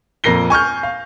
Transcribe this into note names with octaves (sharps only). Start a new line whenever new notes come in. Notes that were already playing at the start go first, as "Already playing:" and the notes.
F2 A#2 A#4 A#6 C7 G7
G#5 C#6 F6 G6
F5